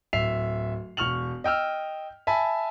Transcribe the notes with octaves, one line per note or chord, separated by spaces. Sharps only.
D1 E5 C7 F7
E1 C#6 F6 F7 F#7
D#5 G5 E6 F6
E5 G#5 A5 B5